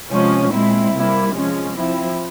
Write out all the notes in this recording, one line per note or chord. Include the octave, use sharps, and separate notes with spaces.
C3 F3 G#3 C#4
A#2 G#3 C4 E4
C3 G3 A#3 E4
F3 G#3 C#4
F3 C4 E4